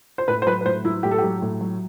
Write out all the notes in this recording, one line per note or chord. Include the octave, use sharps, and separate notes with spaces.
C5
A2 B4
C5
F#3 B4
B4
A2 C5
F#3 E4
A2 G4
A4
F#3 G4
A2
F#3